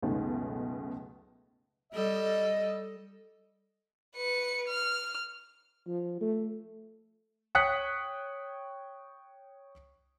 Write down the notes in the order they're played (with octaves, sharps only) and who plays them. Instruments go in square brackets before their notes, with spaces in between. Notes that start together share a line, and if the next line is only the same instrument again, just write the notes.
[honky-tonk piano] C#2 F#2 B2 D#3 A3
[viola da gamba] G3 A4 [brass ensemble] D#5
[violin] B4 C#7
F6
[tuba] F3
A3
[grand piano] C#5 G5 D#6 F#6 B6 C#7